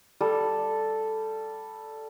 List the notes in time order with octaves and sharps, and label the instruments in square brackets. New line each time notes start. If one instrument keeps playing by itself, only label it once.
[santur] G3 A4